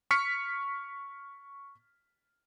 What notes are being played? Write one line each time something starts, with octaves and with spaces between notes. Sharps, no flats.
C#6 F6 B6 C#7